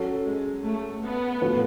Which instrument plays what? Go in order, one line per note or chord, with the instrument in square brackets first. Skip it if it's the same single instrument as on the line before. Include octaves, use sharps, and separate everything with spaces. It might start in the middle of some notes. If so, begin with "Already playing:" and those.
Already playing: [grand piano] F#3 C#4 F#4 A4
[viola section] G#3
A3
B3
[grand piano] A2 F3 B3 F#4 A4